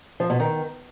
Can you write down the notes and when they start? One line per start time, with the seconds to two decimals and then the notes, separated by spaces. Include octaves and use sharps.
0.20 F3
0.30 B2
0.40 D#3